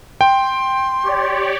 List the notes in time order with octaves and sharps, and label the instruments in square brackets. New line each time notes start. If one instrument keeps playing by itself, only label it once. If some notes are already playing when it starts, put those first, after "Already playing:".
[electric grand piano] G5 [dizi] C6
[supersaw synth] G4 C#5 D5